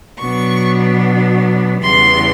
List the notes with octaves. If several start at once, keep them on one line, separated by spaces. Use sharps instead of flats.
B2 F#3 B3 D4 C#6
E2 C#3 E3 G3 B3 C6